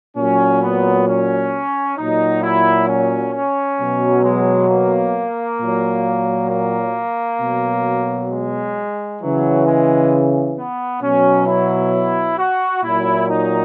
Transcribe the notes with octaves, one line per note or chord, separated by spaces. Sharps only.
A#2 F#3 C#4
B3
C#4
A#2 F#3 D#4
E4
C#4
C#4
B2 F#3
G#3
A#3
A#2 F#3
A#3
B2 F#3
G#3
C#3 E3 F#3
G#3
B3
B2 F#3 C#4
E4
F#4
A#2 F#3 E4
D#4